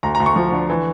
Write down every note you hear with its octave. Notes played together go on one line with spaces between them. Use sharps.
D2 A#5
A#5
D2
C#6
F3
D3
E3